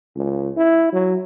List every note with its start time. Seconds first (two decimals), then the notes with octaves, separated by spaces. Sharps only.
0.16 C#2
0.57 E4
0.93 F#3